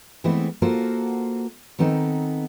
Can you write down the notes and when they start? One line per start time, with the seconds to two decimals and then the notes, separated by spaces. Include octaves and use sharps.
0.24 E3 G#3 A3 B3 C4 E4
0.62 A#3 F4 F#4 A4 A#4 C5
1.79 D#3 B3 C4 D#4 A4